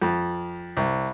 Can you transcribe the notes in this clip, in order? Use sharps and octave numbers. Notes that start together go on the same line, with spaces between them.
F2
C2